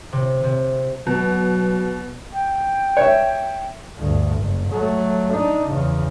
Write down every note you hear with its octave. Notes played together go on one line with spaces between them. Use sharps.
C3
C3
B2 F#3
G5
C#5 E5
D2 G2
F#1
F#3 A3
D4 D#4
E2 C#3